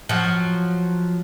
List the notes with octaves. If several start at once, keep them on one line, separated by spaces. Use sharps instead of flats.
F3 F#3